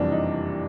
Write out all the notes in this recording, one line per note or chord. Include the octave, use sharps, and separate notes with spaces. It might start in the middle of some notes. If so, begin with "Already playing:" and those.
Already playing: F#1 F2 C3 E3 G3 D4
D#4